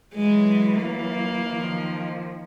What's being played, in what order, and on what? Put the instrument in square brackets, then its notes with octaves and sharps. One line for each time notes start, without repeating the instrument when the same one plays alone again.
[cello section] E3 F#3 [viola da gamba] G#3
[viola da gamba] A#3
[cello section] D#3 F3